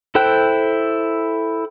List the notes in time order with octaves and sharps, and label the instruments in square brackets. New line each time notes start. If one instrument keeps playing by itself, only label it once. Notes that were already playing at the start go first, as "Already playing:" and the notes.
[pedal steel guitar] E4 A4 C5 G5 F#6